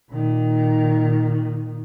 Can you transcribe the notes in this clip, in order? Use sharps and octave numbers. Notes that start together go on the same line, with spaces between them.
A#2 D#3